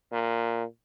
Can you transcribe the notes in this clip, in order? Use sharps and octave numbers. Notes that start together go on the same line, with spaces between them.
A#2